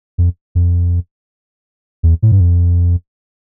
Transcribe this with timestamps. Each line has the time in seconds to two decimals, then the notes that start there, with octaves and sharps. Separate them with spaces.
0.18 F2
0.55 F2
2.03 E2
2.22 A2
2.32 G2
2.40 F2